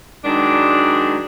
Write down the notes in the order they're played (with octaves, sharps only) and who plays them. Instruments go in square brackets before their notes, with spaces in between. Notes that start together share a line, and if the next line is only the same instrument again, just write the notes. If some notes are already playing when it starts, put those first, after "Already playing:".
[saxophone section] D#3 F#3 G#3 D4